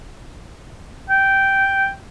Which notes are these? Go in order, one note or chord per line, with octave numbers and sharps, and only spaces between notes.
G5